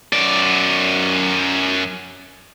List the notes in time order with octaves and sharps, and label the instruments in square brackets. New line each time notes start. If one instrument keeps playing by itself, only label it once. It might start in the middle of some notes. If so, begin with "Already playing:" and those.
[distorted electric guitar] F#2 D5